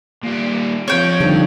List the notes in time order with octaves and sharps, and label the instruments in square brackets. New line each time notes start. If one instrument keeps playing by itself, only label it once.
[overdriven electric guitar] A#2 G3
[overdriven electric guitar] F3 C4 [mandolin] C#5 G5
[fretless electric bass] D3 [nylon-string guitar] G3 D#4 A4